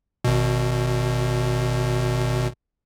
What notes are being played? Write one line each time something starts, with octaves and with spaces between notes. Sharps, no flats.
G#1 B2